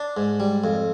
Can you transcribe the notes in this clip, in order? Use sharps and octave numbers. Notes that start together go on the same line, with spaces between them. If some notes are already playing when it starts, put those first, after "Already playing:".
Already playing: D4
G#2
G3
F2